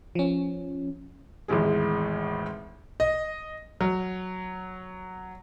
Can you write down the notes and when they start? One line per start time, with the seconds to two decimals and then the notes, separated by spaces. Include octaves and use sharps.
0.15 F3 C#4
1.48 G#1 E2 A2 G#3 G#4
3.00 D#5
3.81 F#3